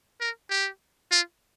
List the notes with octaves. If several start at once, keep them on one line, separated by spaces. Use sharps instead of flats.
A#4
G4
F4